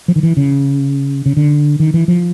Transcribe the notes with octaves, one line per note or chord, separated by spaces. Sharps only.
F3
D#3
E3
C#3
C#3
D3
D#3
E3
F3